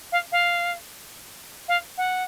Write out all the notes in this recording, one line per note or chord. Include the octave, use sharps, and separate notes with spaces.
F5
F5
F5
F#5